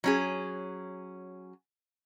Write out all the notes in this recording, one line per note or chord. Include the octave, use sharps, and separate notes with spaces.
F#3 C#4 G#4